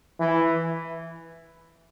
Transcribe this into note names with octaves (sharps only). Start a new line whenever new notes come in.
E3